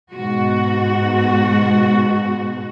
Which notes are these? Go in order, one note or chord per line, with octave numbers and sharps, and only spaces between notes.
G#2 B2 F#4